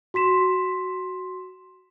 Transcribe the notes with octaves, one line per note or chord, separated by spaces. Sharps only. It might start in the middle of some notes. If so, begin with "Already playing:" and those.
F#4 C6 B6 E7